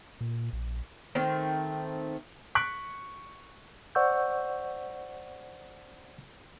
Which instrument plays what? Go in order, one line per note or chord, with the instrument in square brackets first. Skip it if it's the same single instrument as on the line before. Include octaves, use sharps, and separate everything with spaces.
[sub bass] A#2
A#1
[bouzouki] D#3 A3 C4
[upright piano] C#6 F#6 B6 C#7 D7 F#7
[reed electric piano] C5 D5 F#5 C#6 E6 G6